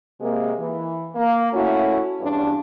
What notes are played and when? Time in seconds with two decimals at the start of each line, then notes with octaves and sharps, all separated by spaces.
0.21 C3 G#3 A#3
0.59 E3
1.15 A#3
1.54 A3 C#4 E4 F#4
2.21 E2 G2 C#4 D4